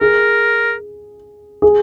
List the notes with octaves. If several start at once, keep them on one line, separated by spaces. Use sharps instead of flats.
G#4 A#4
G#4